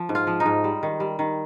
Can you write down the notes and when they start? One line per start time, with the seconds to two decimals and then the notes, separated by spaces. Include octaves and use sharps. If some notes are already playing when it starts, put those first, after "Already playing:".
Already playing: F3
0.09 G#2
0.15 F4
0.27 F3
0.40 D#4
0.46 G#2
0.64 G3
0.83 D#3
1.00 G3
1.19 D#3